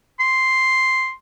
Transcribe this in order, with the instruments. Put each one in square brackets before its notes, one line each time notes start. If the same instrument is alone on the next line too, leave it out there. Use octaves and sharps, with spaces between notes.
[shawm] C6